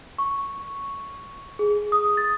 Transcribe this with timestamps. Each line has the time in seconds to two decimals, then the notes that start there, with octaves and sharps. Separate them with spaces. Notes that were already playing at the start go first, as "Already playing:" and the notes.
0.18 C#6
1.59 G#4
1.92 D#6
2.17 A6